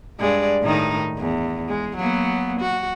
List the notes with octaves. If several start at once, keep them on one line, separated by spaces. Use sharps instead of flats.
G2 G#3 D5
A2 D#3 D#4
E2
G#3
F#3 A#3 B3
F#4